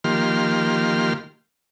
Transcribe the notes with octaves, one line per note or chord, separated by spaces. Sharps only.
D#3 F3 A#3 G4 C6 F6